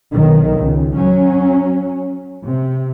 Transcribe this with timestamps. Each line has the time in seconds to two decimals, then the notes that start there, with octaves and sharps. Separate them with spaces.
0.12 B1 D#3
0.59 C#2
0.95 F#3 C#4
2.46 C3